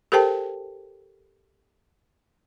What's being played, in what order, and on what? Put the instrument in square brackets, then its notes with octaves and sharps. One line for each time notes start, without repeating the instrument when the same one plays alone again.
[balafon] G4 A4 A#4 C5 G5 A5